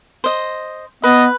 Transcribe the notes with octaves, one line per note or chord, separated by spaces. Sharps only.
C5 D#5
B3 B4 D#5